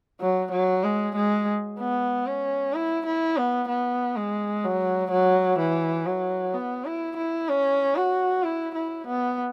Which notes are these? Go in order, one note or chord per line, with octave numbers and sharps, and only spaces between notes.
F#3
F#3
G#3
G#3
B3
C#4
E4
E4
B3
B3
G#3
F#3
F#3
E3
F#3
B3
E4
E4
C#4
F#4
E4
E4
B3